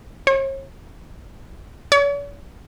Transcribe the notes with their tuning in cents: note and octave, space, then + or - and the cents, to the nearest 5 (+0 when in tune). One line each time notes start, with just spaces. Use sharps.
C#5 -40
C#5 +45